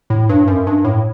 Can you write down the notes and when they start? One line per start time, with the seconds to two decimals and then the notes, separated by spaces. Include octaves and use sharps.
0.10 A2
0.29 G2
0.48 F#2
0.67 G2
0.85 A2